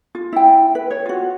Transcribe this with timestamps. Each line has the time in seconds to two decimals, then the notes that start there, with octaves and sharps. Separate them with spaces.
0.15 F4
0.33 E4 G5
0.75 B4
0.91 C#5
1.06 F4 F#4